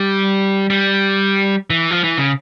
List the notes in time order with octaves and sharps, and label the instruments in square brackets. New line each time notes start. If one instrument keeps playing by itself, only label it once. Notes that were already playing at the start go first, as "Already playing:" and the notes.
Already playing: [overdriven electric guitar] G3
G3
E3
F3
E3
C#3